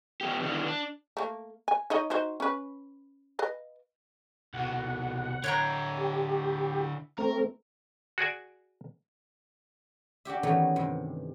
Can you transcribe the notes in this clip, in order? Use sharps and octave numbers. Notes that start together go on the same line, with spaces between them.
F3 B3 G4
D3 D#3 G3 B3 D4 E4
D4
A3 A#3
G#5
D#4 C#5 D#5
D#4 F#4 C5
C#4 B4
B4 D#5 F5
C2 B2 F#5
D3 E4 C#5 G5 A#5
G4
A3 C4 A#4
F#4 G#4 D5 G#5
D4 F#4 G4 E5
D#3 E3 A3 B3 C#4 D#4
G2 C3